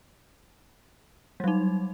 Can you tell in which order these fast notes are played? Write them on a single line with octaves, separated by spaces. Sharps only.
G3 F#3 D#4